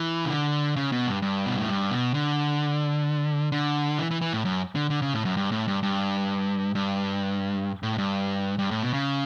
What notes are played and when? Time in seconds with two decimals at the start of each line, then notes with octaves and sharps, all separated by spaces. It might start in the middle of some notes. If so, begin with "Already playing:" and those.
Already playing: E3
0.25 C#3
0.30 D3
0.76 C#3
0.92 B2
1.07 G2
1.22 G2
1.46 B2
1.58 A2
1.69 G2
1.91 B2
2.14 D3
3.52 D3
3.99 E3
4.11 E3
4.21 E3
4.33 A2
4.45 F#2
4.75 D3
4.90 D3
5.02 C#3
5.13 A2
5.25 F#2
5.37 G2
5.52 A2
5.68 G2
5.83 G2
6.75 G2
7.83 A2
7.98 G2
8.59 G2
8.71 A2
8.83 B2
8.93 C#3